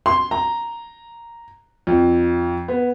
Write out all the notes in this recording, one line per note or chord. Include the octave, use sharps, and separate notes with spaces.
C6
A#5
F2
B3